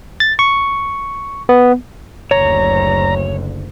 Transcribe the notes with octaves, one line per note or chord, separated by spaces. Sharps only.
A6
C#6
B3
F#1 D2 C#5 A#5